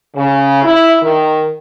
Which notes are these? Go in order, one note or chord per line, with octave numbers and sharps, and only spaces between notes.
C#3
E4
D#3